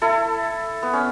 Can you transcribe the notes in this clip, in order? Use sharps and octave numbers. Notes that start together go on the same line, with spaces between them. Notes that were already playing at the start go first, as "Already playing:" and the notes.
E4 A4
B3
C#4